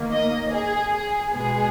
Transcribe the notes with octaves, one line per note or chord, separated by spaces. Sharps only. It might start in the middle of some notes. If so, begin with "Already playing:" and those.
Already playing: D#3 A#3
D#5
G#4
G#4
B2 G#3 B3 G#4